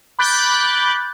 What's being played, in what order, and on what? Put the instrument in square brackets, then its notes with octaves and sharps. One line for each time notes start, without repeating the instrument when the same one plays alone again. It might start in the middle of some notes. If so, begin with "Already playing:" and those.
[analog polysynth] B5 D6 F#6 G6 A6